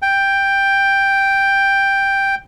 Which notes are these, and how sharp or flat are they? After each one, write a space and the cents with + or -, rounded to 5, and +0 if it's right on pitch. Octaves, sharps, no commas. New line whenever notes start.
G5 +5